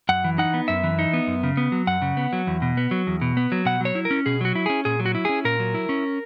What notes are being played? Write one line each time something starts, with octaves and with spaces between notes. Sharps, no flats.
F#2 F#5
E3
D#4 F#5
B3
F#2 E5
E3
D#4
B3
F#2
C#3
B3
F#3
F#2 F#5
C#3
B3
F#3
E2
B2
B3
F#3
E2
B2
B3
F#3
B2 F#5
F#3 C#5
E4
A#4
C#4
B2 G#4
F#3 F#4
E4
C#4 G#4
A#2 G#4
F#3
F#4
E4
C#4 G#4
A#2 A#4
F#3
E4
C#4